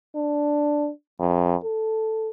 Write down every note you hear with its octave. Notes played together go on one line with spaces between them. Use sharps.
D4
F2
A4